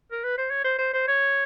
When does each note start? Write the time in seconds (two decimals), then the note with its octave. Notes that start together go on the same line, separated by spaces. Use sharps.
0.11 A#4
0.24 B4
0.37 C5
0.50 C#5
0.64 C5
0.78 C5
0.93 C5
1.08 C#5